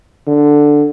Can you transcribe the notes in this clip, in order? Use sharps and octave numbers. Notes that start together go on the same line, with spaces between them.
D3